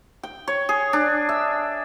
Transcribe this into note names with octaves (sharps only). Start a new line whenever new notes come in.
G5
C#5
G#4
D4
E5